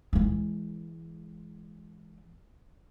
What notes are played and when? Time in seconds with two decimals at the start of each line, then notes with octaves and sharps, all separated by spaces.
0.13 E3 G#3